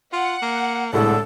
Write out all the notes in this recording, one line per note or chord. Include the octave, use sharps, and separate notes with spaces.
F4 F#5
A#3
C2 A2 D3 G#3 A4